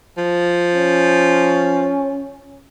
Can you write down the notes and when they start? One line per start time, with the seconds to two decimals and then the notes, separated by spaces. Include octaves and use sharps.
0.17 F3
0.73 C#4